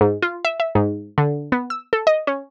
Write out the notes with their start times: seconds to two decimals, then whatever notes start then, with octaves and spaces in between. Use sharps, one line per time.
0.01 G#2
0.22 F4
0.45 E5
0.60 E5
0.75 G#2
1.18 D3
1.52 B3
1.70 E6
1.93 A4
2.07 D#5
2.27 C#4